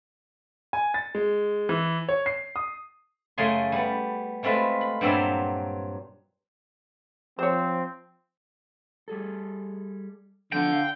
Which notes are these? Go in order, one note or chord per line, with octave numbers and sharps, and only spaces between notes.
G#5
A6
G#3
E3
C#5
C7
D#6
F#2 C#3 A3 G#4 G#5 C6
G3 B3
G#3 A3 C4 F4 B4
B5
G2 A#2 F#3 C4 E5 C6
F3 C4 C5 C#5
G3 G#4 A4
E2 D3 F3 B3 G5
F5